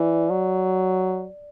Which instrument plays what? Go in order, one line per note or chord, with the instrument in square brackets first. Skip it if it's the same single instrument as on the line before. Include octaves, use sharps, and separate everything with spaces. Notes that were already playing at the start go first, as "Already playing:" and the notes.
Already playing: [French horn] E3 [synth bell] D5
[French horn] F#3